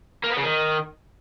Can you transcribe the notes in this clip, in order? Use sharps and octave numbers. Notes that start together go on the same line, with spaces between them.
A#3
B3
C#3
D#3